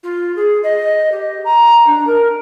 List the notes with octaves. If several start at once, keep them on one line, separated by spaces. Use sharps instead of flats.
F4
G#4
D#5
G4
A#5
D4
A#4